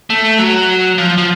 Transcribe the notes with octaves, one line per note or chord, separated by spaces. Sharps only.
A3
F#3
F3
F3